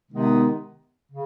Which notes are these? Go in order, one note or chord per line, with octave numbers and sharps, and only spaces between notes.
C3 D#3 G#3 B3 D#4
C#3